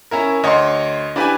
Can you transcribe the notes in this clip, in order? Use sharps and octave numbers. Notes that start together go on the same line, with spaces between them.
C#4 E4 A#4
D2 C#5 D#5 C6
D4 E4 G4 B4 G#5